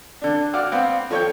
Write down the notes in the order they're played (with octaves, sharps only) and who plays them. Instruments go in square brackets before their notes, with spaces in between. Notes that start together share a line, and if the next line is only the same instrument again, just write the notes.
[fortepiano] D3 D4
F#4 D5 F5
[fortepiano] B3 C4 [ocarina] F5
[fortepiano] F3 C#5 G5 [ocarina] A4